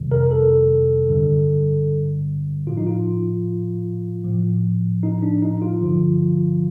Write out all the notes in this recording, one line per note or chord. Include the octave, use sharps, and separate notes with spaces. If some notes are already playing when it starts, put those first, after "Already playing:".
Already playing: F2 C3 D#3 G3
A#4
A4
G2 D3 G3
A2 F3 F4
D#4
F4
A2 F3
D#4
D4
D#4
F4
G2 D3 F3